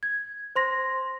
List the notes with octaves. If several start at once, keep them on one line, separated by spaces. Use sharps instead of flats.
G#6
C5 C6 A#6